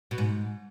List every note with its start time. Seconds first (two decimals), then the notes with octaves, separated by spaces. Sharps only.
0.11 B2
0.18 G#2